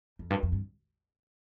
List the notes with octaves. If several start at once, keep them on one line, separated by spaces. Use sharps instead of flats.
F2
G2
F2
G2